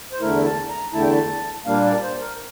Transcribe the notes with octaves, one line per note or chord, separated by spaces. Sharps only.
C5
E2 D3 A3 E4 A#4
A5
A#5
E2 D3 A3 E4 A5
G5
A5
A#2 G3 A#3 D4 F5
D5
C5
A#4